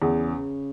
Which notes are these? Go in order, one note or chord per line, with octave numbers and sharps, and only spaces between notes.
E2 C#3